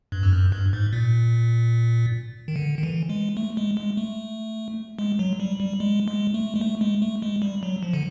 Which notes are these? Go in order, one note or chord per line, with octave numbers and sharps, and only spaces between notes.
G2
F2
F#2
G2
G#2
A#2
D#3
D3
D#3
E3
G#3
A3
G#3
G#3
A3
G#3
F#3
G3
G3
G#3
G#3
A3
G#3
A3
G#3
A3
G#3
G3
F#3
F3
D3